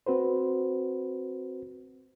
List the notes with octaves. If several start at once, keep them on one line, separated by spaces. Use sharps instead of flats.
C4 F#4 B4 C5